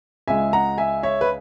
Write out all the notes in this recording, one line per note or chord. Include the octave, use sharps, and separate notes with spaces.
C#2 C#3 G#3 E5 G#5
F#5 A#5
E5 G#5
C#5 E5
B4